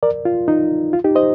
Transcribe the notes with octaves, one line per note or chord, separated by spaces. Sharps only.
A#4 D5
F4
D#4
F4
D#4 G4
C5 D#5